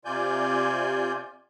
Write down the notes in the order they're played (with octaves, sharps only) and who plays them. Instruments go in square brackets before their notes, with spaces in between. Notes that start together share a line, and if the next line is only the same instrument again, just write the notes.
[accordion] C3 F4 D5 G#5 G6